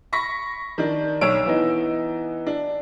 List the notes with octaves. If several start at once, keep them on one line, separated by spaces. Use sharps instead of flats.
B5 C#6 A#6 B6
D#3 D4
B1 C#5 E6 D7
E3 B3 D#4
D4